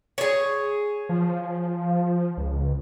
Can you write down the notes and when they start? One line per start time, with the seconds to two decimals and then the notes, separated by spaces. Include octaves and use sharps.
0.18 G#4 C#5
1.09 F3
2.37 C#2